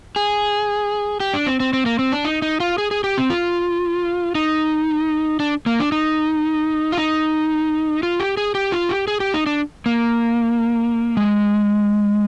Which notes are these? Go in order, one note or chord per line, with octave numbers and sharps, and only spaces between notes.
G#4
G4
D4
C4
C4
C4
A#3
C4
D4
D#4
D#4
F4
G#4
G#4
G4
C4
F4
D#4
D4
A#3
D4
D#4
F4
D#4
F4
G4
G#4
G4
F4
G4
G#4
G4
D#4
D4
A#3
G#3